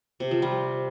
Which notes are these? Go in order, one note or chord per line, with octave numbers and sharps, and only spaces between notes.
C3
F3
G3